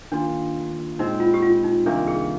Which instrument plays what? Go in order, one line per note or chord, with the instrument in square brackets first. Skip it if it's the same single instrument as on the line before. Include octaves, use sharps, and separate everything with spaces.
[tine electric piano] D#3 A#3 F4 [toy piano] D4
[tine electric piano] A#2 G#3 C4 [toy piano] D#4
[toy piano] F4
G4
F4
D#4
[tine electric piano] C2 C3 D#3 A#3 [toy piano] D4
[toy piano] G#4